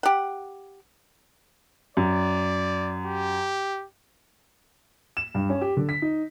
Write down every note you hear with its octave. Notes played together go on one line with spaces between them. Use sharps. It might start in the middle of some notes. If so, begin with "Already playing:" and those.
G4 F#5
F#2 D5
G4
E7
G2
C#4
G4
D3
B6
D#4